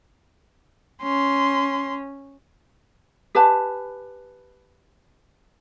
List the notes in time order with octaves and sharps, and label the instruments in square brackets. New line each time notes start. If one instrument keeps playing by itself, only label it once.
[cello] C#4 [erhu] C6
[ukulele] G4 B4 G#5 A5